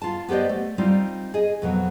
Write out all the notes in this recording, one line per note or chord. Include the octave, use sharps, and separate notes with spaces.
F4 A5
B3 G4 C5 D5 D#5
A3
G3 C4 D#4 F4
G#4 D#5
F2 B2 F#3